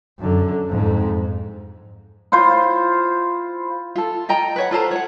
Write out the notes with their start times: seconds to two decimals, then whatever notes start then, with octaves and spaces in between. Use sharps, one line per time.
0.19 F#2 D3
0.69 F2 G#2
2.32 E4 F4 C5
3.96 F4 A4
4.29 F4 D#5 G5 A#5
4.56 B4 C#5 F#5
4.71 F4 A4 C5 A#5
4.91 C#5 F#5